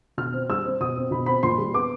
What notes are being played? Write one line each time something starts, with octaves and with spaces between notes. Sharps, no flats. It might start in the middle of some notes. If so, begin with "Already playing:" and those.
B2 F6
C4
G3 E6
C4
B2 D#6
C4
B2 B5
C4 B5
A#2 C6
G3
B3 D6